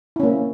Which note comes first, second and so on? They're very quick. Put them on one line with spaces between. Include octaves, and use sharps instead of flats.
E4 C#4 A#3 C4